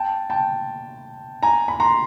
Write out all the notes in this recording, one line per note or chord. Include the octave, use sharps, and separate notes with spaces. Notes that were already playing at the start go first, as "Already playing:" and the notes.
Already playing: G5 A5
G5 A5
G#5 A#5
B5
A#5 C6